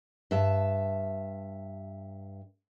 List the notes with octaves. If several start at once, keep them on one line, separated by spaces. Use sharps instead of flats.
G2 E5 A5